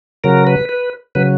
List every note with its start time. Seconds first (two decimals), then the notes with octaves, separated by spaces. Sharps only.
0.24 C#3 F#3 A#4
0.47 B4
0.69 B4
1.15 C#3 F#3 B4